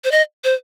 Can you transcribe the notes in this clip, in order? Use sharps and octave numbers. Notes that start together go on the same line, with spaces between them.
C5
D#5
C5